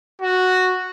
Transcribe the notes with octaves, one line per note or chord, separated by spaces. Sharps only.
F#4